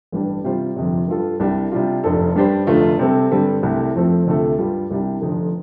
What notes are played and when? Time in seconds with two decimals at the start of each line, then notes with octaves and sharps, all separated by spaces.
0.12 A1 G2 G3 D4
0.44 C3 G3 F4 C5
0.76 G1 F2 C3
1.08 G2 G3 F4 A4
1.40 C2 C3 G3 D4
1.72 C3 G3 D4 F4
2.04 F1 F2 F3 D4 A4
2.35 G2 G3 D4 G4 C5
2.67 F1 F2 D3 A3 F4
2.99 C3 G3 C4 A4
3.31 G2 D3 G3 C4 A4
3.63 C2 C3 A3
3.95 F2 F3 A3 C4 A4
4.27 D2 C3 A3 F4 A4
4.58 G2 G3 F4
4.91 C2 C3 G3 D4
5.21 F1 F2 D3 F3